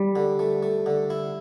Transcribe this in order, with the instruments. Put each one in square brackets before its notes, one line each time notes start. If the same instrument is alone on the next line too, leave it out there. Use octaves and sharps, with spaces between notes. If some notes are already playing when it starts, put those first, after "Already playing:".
Already playing: [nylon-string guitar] G3
[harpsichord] D3
A3
A3
D3
E4